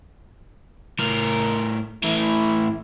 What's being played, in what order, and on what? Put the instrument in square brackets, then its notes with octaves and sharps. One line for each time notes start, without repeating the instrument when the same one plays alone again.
[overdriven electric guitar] A2 A#4
[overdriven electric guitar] A2 E3 [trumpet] E4